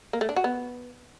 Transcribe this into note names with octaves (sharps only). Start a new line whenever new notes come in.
A#3
A3
D4
F#4
B3